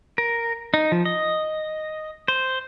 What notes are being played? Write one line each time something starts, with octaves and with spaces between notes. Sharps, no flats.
A#4
D#4
F3
D#5
C5